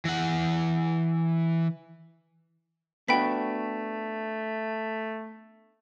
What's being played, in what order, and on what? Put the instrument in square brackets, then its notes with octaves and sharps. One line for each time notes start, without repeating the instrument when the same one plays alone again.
[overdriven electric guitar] E3 F#5
[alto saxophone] A3 [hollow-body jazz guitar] B3 D4 F#4 [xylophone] G5 B5 B6